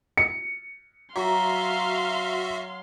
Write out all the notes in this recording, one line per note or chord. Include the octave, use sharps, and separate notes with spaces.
C#7
F#3 F#4 E5 F5 C6